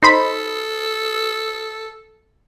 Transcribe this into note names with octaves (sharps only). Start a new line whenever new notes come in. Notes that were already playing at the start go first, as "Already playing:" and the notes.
D#4 A4 C5 B5